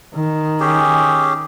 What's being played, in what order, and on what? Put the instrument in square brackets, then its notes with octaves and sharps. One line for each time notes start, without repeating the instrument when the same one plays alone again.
[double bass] D#3
[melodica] C#4 G4 G#4